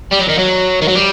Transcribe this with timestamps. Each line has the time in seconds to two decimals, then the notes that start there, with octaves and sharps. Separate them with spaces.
0.12 G3
0.20 F#3
0.29 D#3
0.39 F#3
0.82 D#3
0.88 F#3
0.95 G3